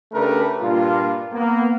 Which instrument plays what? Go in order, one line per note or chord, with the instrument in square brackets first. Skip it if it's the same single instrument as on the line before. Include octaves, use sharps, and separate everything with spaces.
[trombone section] C#3 A3 D4 G4 A#4 B4
G2 A#2 A#3 F4
A#3 B3